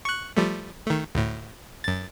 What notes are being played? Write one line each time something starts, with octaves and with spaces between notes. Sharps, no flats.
C#6 F#6
F3 G3 A3
D#3 A3
D2 A2
F#2 A6